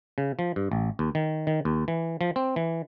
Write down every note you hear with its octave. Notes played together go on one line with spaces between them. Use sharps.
C#3
F3
G2
A1
D#2
D#3
D#3
D#2
E3
F3
C4
E3